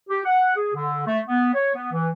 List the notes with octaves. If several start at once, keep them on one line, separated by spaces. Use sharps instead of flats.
G4
F#5
G#4
D3
A3
B3
C#5
B3
E3